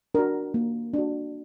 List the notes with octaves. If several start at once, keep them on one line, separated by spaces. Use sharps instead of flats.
D4 F#4 A#4
A#3
D4 F#4